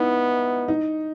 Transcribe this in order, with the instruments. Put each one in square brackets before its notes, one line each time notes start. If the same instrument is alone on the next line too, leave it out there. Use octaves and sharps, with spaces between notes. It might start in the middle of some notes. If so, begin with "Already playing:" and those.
Already playing: [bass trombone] B3 [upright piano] D#4 E4
[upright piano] D#4